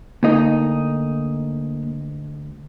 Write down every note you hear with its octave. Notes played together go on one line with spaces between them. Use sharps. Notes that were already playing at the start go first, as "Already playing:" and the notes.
D2 A#3 D#4